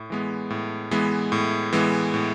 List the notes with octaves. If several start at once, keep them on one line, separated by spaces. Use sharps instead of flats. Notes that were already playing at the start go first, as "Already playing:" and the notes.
Already playing: A2
E3 G#3 B3
A2
E3 G#3 B3
A2
E3 G#3 B3
A2